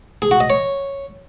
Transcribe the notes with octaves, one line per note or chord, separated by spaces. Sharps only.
G#4
F#4
D#5
C#5